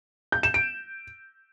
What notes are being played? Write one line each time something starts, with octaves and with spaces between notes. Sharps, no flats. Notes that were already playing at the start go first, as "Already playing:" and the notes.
G6
E7
D7